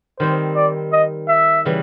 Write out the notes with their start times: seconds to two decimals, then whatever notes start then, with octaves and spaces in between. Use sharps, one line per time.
0.20 D#3 G3 C4 C5
0.56 D5
0.92 D#5
1.28 E5
1.65 C#3 E3 G3